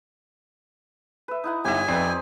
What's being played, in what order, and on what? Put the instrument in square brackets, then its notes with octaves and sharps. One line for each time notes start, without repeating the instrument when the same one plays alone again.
[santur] B4 E5
D#4 E4 F#5
[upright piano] G1 D#4 [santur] G4 D#5 E5 [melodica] G#5
[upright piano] F2 D5 C7 [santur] C4 D#4 B4
[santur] C5